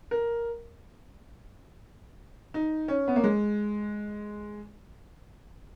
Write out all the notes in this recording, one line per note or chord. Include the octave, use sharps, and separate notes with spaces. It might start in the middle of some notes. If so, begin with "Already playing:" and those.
A#4
D#4
C#4
B3
A#3
G#3